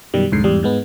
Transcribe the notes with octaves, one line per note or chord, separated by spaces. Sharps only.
F#2 B2 D#3 G3
C2 F2 G#2 D3 C7
E2 G#2 G3
G#2 G#3 B3